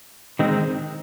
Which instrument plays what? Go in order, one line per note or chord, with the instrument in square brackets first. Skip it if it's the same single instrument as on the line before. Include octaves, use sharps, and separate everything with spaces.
[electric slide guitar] D#3 G#3 C4 D#4